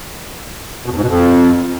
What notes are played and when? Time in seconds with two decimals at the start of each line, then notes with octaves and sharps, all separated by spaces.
0.86 B2
0.92 E2
0.97 G#2
1.02 B2
1.07 F2